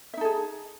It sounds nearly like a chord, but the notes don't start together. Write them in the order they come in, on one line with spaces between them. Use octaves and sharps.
E5 D#4 A4 G#4